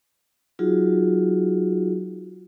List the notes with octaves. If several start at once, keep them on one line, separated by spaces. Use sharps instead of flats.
F#3 D#4 F4 F#4 G#4